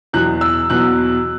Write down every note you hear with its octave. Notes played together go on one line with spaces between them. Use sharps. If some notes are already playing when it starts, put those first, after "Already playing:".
E2 B2 F#3 F#6
E6
E2 B2 F#3 F#6